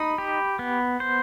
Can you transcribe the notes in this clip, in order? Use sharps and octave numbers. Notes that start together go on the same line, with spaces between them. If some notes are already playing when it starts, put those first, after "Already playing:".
Already playing: D#4 B5
G4
B3
C5